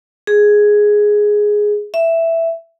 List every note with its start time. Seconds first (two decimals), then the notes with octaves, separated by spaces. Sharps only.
0.27 G#4
1.94 E5